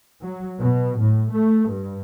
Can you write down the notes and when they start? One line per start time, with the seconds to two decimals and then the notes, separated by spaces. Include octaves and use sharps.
0.22 F#3
0.61 B2
1.00 A2
1.35 A3
1.71 G2